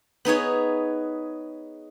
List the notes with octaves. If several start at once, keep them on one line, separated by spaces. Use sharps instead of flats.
B3 D#4 G#4 C#5